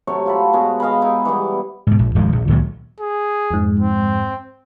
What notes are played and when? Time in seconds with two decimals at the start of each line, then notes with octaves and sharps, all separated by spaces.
0.07 C3 F#3 A3 C#5
0.26 F4 A4 B5
0.53 B2 G#3 F#4 G#4
0.80 D#5 F5 G#5 B5
1.02 D#4 E4 G#4
1.25 E3 G3 B3
1.87 G#2 B2
1.99 A#1
2.15 D1 G#1 F3 G#3
2.32 A#1
2.48 C#2 A#2 D#3 F#3
3.00 G#4
3.51 F2 G#2
3.80 C4